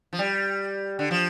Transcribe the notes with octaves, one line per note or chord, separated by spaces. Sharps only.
F3
G3
D3
F3